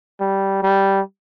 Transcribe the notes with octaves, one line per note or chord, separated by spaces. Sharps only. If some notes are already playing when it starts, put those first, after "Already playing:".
G3
G3